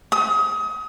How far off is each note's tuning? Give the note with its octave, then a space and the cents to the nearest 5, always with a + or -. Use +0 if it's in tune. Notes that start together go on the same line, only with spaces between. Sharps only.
D#6 +30